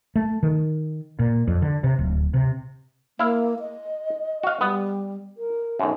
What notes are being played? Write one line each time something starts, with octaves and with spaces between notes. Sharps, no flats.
A3
D#3
A#2
F2
D3
C3
D1
C3
A#3 E4 F5
D#5
F#4 F5
G3 B3
A#4
B1 F#2